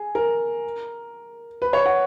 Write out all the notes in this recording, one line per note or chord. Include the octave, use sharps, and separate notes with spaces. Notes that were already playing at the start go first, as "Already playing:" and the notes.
Already playing: G#4
A#4
B4
C#5
F#5